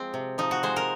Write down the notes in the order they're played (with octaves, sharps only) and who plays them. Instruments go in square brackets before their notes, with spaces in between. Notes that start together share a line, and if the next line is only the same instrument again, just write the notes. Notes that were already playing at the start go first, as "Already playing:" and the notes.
Already playing: [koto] F3 G#3 C4
C3
F3 D#4
F#4
G#3 C5
A#4